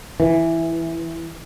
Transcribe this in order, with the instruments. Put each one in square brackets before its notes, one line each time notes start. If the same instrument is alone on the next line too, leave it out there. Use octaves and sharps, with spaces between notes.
[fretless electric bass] E3